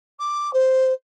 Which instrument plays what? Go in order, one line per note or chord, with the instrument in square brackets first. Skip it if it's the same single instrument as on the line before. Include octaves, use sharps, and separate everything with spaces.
[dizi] D6
C5